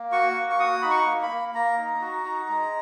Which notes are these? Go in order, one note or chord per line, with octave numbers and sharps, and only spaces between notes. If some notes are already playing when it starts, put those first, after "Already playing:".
Already playing: A#3
F#4 C#6
A#3
C#6
F#4 D#6
D#4 B5
C#6
A#3
B5
A#3
A#3 A#5
D#4
F#4
D#4
G#3